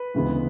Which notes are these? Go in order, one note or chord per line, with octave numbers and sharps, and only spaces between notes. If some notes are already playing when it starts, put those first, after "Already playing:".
Already playing: B4
D2 C#3 E3 G#3 B3